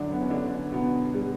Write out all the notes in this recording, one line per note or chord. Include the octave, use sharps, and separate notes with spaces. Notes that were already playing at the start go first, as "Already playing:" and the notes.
Already playing: F#2 D3 F#3 D4
B3
C#4
D3 D4
B2 B3
G3